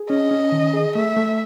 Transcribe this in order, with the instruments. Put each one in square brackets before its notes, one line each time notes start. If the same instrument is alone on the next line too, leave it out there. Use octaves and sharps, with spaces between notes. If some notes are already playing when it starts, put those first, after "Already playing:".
Already playing: [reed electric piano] G#4
[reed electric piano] C#4 [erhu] D#5
[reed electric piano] C#4
D#3
G#4
[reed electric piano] A3 [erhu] E5
[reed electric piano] A3